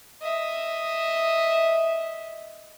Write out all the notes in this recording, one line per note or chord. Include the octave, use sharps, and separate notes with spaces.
D#5 E5